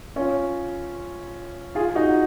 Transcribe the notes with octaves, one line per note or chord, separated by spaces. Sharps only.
C#4 F4
F4 G#4
D#4 F#4